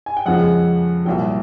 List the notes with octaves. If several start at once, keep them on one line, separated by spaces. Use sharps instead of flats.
G#5
G5
F2 C#3 F3 G#3 F#5
C2 A#2 F#3 G5